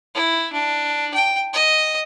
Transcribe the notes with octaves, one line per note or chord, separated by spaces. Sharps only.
E4
D4
G5
D#5